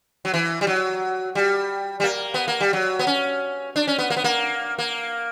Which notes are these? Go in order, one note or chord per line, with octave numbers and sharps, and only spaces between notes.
F#3
E3
G3
F#3
G3
G3
A#3
B3
A#3
G3
F#3
B3
C#4
D4
C#4
B3
A#3
B3
A#3
A#3